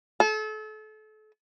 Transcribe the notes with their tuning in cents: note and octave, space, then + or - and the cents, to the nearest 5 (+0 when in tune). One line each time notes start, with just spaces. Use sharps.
A4 -35